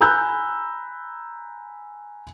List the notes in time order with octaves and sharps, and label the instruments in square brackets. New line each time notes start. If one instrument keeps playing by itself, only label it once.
[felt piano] G#5 A#5 B5 E6 F#6 G6